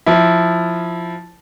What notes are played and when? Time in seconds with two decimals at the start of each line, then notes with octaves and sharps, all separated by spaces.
0.06 F3 E4